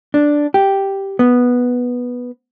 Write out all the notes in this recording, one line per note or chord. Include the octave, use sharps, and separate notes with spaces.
D4
G4
B3